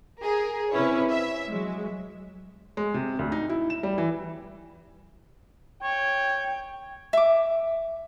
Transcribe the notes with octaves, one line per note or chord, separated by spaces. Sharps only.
G#4 A#4
C3 C#4 E4 B4 C#5
E5
F#3 G#3
G#3
C3
D2
D#4
E4
E7
G3
E3
C#5 G5
E5 D6